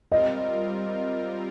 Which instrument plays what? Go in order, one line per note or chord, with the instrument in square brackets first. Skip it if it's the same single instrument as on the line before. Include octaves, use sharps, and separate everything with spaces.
[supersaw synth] G3 C4 F4 A#4 [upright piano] D#5